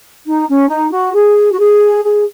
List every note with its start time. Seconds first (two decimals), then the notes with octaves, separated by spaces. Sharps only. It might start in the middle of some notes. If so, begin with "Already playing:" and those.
0.25 D#4
0.48 C#4
0.69 D#4
0.92 F#4
1.14 G#4
1.52 F#4
1.60 G#4
2.04 G#4